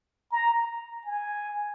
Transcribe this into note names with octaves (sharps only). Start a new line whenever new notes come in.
A#5
G#5